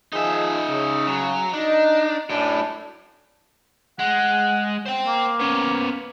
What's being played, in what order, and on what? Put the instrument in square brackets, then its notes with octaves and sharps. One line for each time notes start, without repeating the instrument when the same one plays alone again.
[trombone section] D#3 F3 G#4 [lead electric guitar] D#4 E5
[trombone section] C#3
[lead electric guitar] F#3
[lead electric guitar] D4 [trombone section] D#4
[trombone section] F#2 D4 [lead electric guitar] A2
[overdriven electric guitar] G#3 [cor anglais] F#5
[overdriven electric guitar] C5 G5
[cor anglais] A#3
[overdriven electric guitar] B3 C#4